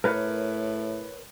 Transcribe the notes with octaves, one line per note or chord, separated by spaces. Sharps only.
A2 A#4 B4 C#5